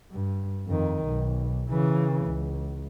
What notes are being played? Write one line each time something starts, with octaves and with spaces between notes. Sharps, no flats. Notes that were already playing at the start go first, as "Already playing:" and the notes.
G2
F2 D#3
B1
C#3 E3
C#2